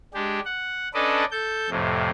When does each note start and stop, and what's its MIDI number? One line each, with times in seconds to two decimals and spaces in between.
0.14 0.40 56
0.14 0.40 62
0.14 0.40 67
0.45 0.88 78
0.94 1.25 61
0.94 1.25 62
0.94 1.25 69
0.94 1.25 71
0.94 1.25 74
0.94 1.25 75
1.31 1.70 69
1.31 1.70 91
1.70 2.10 41
1.70 2.10 45
1.70 2.10 48